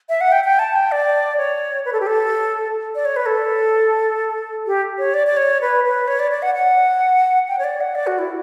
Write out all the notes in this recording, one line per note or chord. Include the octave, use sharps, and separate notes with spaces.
E5
F#5
G5
G5
A5
G5
D5
C#5
B4
A4
G4
A4
D5
C#5
B4
A4
G4
C#5
D5
D5
C#5
B4
B4
C#5
D5
D5
F#5
F#5
G5
C#5
D5
F#5
D5
F#4
E4